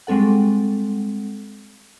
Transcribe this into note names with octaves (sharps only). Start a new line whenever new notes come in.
G3 G#3 C4 A4 F#5